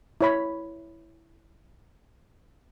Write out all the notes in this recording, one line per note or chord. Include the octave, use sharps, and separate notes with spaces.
E4 C#5 B5